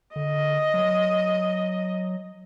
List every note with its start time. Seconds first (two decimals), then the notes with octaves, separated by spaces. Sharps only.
0.16 D3 D#5
0.74 F#3